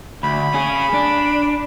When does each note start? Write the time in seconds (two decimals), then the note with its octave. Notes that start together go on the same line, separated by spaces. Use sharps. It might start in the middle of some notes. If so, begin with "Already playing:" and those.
0.23 D2 B5
0.54 C#4 G#4
0.94 D4